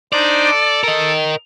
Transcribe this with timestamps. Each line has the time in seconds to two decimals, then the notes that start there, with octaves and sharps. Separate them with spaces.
0.13 D4 D#4 C5 D5
0.51 A4
0.84 A#4 D#5